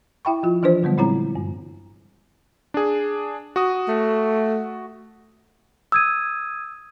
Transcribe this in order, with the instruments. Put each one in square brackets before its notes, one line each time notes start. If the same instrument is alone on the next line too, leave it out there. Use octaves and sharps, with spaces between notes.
[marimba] E4 E5 G5 B5 C#6
F3 F4
E3 F3 D4 F4 B4 C5
D3 F#3 G3 B3
A#2 G#3 C4 E4 C#5 A#5
G2
[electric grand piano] D4 G#4
F#4 D#6
[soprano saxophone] A3
[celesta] D#6 G#6 D#7 [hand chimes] E6